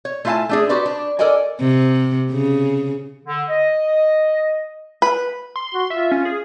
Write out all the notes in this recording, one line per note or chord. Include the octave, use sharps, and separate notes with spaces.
C#5
A3 E4 F4 F5 G#5 A5
A3 D4 G#4
F#4 G4 B4 C5 D5
D4
A4 A#4 D5 D#5 G#5
C3
C#3
D3
D#5
B4
C6
F#4
F4 E5
C#4
G#4